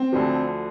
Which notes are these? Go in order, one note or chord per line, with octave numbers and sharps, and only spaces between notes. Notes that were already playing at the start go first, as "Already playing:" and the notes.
Already playing: C4
D2 D3 F3